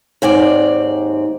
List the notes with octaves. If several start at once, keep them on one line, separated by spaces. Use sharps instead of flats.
D#2 G#2 C4 D5